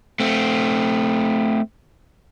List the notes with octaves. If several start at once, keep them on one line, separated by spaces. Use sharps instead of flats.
A3 C4